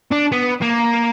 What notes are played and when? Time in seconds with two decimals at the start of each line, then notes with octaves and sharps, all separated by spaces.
0.11 D4
0.32 B3
0.62 A#3